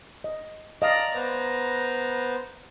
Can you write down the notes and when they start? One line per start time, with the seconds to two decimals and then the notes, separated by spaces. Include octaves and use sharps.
0.24 D#5
0.82 D5 D#5 F5 A5 A#5
1.15 B3 B4 C5 A#5